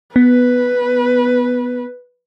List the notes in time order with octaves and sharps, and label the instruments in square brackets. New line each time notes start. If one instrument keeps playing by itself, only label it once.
[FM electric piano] B3 [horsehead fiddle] B4